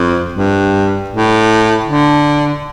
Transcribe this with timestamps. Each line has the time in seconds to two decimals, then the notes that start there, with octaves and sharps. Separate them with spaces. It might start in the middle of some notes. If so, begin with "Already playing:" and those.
Already playing: F2
0.34 G2
1.10 A2
1.86 D3